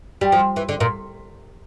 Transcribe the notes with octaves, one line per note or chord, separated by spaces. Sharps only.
G3
F3
E3
D3
A#2